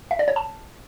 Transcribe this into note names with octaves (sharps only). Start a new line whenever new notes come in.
E5
D5
C#5
A5